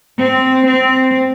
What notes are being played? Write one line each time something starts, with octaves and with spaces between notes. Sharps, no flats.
C4
C4